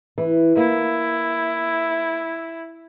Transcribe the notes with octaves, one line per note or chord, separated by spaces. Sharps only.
E3
A#3 E4